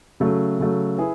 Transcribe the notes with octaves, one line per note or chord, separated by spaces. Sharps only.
C#3 F#3 A3
C#3 F#3 A3
E4 G#4 B4